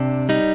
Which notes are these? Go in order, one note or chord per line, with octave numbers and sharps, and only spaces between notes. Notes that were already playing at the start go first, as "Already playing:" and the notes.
Already playing: C3 D4
G3 D#4